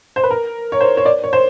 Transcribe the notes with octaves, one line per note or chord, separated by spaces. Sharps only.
C5
B4
A#4
C#5
C5
C#5
D5
C#5
C5